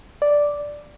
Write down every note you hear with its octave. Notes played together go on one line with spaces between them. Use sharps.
D5